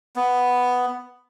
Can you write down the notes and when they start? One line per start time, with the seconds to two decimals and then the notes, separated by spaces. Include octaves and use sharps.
0.16 B3